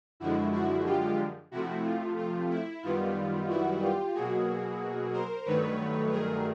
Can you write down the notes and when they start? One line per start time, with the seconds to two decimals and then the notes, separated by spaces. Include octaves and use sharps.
0.20 F#2 D3 F3 G#3 E4 F#4
0.52 E4 F#4
0.85 F4 G4
1.51 C3 F3 A3 E4 F#4
1.84 F4
2.17 F4
2.50 E4
2.83 F#2 D#3 G3 B3 F4
3.49 E4 F#4
3.81 F4 G4
4.14 B2 F#3 A#3 F#4 G#4
5.13 A#4 C5
5.45 G2 D#3 F#3 A3 B4 C#5
6.11 G#4 A#4